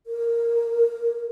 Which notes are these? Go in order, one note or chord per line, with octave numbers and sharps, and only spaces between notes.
A#4